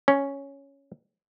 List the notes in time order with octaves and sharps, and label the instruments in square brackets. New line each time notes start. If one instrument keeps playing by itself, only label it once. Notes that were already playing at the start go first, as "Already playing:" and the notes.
[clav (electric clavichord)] C#4